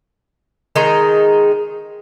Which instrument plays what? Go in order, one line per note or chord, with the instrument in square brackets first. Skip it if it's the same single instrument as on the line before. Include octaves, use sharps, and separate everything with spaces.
[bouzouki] D#3 G#3 D#4